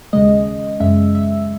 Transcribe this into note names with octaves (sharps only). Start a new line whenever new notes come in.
D#2 C#3 G#3 D#5
F#2 C#3 G#3 E5
E5